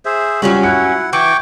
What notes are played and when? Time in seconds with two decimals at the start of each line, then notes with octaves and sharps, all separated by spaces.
0.05 G#4 C5 E5
0.42 F#3 G3 C#4 F4 F#4
0.63 E4 F#5 F#6 C#7
1.13 E3 G5 C#6 D6